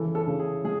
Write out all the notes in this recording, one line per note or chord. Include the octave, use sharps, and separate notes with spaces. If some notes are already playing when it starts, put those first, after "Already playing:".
Already playing: C#3 E3 G#3 A4
A4
C#3
G#4
G#3 G#4